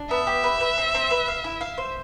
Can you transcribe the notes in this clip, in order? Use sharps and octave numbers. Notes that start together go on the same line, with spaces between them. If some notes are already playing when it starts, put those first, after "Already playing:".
Already playing: D4
B3 E5
G4
B4
B4
C4
C4
B4
F5
E4
F5
C5